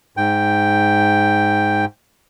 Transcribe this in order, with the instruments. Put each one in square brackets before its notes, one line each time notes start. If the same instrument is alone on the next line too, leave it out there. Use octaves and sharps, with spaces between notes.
[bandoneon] G#2 G5